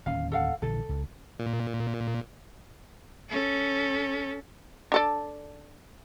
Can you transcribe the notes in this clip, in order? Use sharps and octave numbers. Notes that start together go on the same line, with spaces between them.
D1 D#2 C#4 F5
A4 F5 F#5
A#1 D3 E3 A4
C#2
A#2
C#4 A4
D4 A4 D5